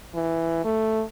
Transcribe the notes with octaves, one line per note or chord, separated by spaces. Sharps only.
E3
A3